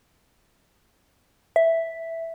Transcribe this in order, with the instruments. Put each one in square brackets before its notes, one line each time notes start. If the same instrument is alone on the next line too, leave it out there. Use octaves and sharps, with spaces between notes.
[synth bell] E5